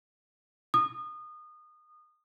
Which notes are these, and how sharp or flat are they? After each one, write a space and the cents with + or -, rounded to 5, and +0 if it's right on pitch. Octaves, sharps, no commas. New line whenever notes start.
D#6 -25